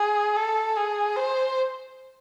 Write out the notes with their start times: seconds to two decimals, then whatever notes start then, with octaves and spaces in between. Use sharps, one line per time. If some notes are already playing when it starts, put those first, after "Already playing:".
Already playing: G#4
0.36 A4
0.77 G#4
1.16 C5